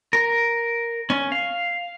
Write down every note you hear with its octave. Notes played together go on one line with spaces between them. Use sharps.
A#4
C#4
F5